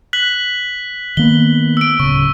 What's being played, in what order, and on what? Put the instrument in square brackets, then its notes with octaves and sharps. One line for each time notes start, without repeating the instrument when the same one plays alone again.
[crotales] F#6 B6 F#7
[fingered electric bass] D#3 A#3 B3 [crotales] G7
[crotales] E6 D7
[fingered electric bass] D1 C#3 [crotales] C#6